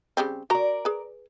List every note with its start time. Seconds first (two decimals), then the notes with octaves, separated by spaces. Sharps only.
0.17 C#3 G3 C4
0.50 F#4 A#4 D5 A#5
0.85 G#4 B4